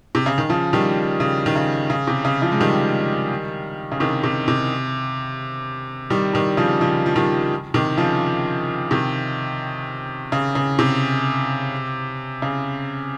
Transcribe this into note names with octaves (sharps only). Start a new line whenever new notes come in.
C3
C#3
D#3
C#3 F3
D#3 G3
C#3
D#3
C#3
C#3
C3
C#3
C#3 F3
G#3
D#3 G3
C#3
C3 D#3
C3
C3
D#3 G3
D#3 G3
C#3 F3
C#3 F3
F3
D#3 G3
C3 D#3
C#3 F3
C3 D#3
C#3
C#3
C3
C#3